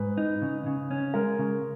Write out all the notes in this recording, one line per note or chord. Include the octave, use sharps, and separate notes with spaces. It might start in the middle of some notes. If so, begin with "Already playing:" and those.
Already playing: G#2 B4
D#4
C#3
C#3
C#4
G#3 A#4
C#3